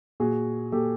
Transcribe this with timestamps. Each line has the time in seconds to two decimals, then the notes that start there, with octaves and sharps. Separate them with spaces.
0.20 A#2 F#4 G#4
0.72 A#2 G4 A4